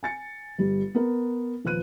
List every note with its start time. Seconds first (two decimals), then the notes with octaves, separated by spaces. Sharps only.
0.03 G#5 A6 C#7
0.58 G1 G3
0.95 B3 A#4
1.65 D#1 F3 B4 F#6 D#7